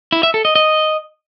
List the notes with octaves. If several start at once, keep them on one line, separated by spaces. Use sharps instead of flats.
E4
E5
A4
D#5
D#5